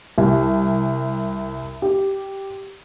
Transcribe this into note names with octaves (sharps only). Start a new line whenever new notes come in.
C2
G4